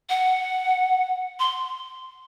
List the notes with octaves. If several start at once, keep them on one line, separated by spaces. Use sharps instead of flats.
F#5
C6